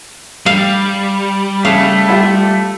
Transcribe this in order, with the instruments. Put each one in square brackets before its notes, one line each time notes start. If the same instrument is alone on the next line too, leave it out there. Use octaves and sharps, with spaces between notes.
[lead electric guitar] G3 [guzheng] F5
[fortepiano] C#3 [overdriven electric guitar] A3 [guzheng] F5
[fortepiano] E4 F4 G4